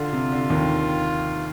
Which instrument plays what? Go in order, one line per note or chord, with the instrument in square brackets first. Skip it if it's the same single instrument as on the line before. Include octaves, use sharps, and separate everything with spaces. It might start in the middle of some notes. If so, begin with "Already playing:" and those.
Already playing: [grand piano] D3 [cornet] F4
[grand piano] C3
D3
D#2 D#3